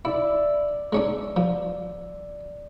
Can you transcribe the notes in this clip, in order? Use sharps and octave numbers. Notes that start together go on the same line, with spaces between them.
E4 D5 E5
G#3 C#4 D4
F3